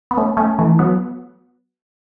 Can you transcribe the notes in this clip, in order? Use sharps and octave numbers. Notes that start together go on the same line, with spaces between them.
B3
A3 C#4
A3 C#4
E3 A3
F#3 B3